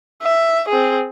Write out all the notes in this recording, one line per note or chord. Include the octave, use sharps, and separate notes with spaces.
E5
C4 G#4